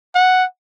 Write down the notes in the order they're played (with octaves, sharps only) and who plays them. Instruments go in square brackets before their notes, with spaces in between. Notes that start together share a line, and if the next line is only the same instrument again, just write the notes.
[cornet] F#5